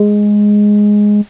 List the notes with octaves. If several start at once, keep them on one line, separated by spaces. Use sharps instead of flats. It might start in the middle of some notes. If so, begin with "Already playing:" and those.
Already playing: G#3